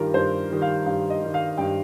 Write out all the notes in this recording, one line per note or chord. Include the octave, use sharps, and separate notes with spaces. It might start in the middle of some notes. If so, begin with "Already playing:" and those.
Already playing: G2 D#3 G3 F4 G4 A#4
G2 C5
D#3 G3
F5
G2 F5
D#5
D#3 G3
F5
G2 G5